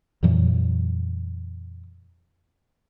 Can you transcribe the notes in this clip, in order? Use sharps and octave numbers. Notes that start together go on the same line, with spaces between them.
F2 A#2 E3 F#3